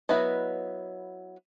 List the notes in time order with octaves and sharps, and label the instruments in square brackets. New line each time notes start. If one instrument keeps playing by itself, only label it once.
[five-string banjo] F#3 B3 E4 B4 D#5